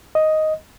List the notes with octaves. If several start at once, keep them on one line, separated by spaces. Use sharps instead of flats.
D#5